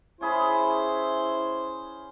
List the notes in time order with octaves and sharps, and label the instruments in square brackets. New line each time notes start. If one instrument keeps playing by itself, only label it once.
[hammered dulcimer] C#4 G#4 B5 [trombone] E4 [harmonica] C5